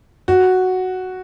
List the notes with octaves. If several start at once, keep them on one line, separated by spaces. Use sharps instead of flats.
F#4